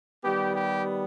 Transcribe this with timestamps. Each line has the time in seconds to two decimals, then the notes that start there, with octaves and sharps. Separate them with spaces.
0.24 D#3 G3 B3 G4
0.55 G4